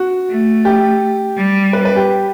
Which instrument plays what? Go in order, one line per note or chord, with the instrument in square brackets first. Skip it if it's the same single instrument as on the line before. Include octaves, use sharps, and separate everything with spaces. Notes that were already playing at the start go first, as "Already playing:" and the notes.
Already playing: [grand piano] F#4
[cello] A3
[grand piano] G4
[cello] G3
[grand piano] B4
B4
G4